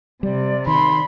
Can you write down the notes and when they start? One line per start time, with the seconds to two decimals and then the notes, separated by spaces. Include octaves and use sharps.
0.23 C3 G3 D5
0.67 D#3 B5 C6